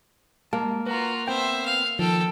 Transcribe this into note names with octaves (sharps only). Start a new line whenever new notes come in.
G#3 A#3 A5
F4 F#4 B4 A#5
B3 C4 C5 E5 G5
F5
D#3 F3 A4 G5